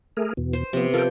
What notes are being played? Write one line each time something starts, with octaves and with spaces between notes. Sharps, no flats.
A3 G#4 A#4
E2 B2
C5
C3 F3 B3
F3 A4 A#4 G5